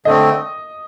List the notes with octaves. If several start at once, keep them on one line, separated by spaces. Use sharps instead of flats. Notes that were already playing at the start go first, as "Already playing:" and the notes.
D3 A3 C4 D#5